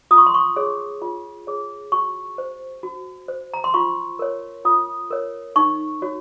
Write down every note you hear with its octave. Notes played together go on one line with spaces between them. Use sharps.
F4 D#6
C#6
C6
C#6
G#4 C#5
F4
G#4 C#5
F#4 C#6
C5
F#4
C5
A#5
C6
F4 C#6
A#4 C#5
F4 D#6
A#4 C#5
D#4 C#6
F#4 C#5